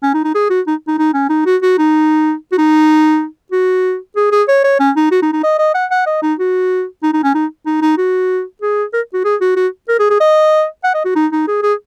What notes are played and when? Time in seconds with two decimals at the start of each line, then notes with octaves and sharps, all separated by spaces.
0.03 C#4
0.14 D#4
0.24 D#4
0.35 G#4
0.50 F#4
0.67 D#4
0.88 D#4
0.98 D#4
1.14 C#4
1.30 D#4
1.46 F#4
1.62 F#4
1.78 D#4
2.52 F#4
2.58 D#4
3.52 F#4
4.16 G#4
4.32 G#4
4.49 C#5
4.64 C#5
4.80 C#4
4.96 D#4
5.11 F#4
5.22 D#4
5.33 D#4
5.44 D#5
5.59 D#5
5.75 F#5
5.91 F#5
6.07 D#5
6.23 D#4
6.39 F#4
7.03 D#4
7.13 D#4
7.24 C#4
7.35 D#4
7.66 D#4
7.82 D#4
7.98 F#4
8.62 G#4
8.94 A#4
9.14 F#4
9.25 G#4
9.41 F#4
9.57 F#4
9.89 A#4
9.99 G#4
10.10 G#4
10.20 D#5
10.84 F#5
10.94 D#5
11.05 F#4
11.16 D#4
11.32 D#4
11.48 G#4
11.63 G#4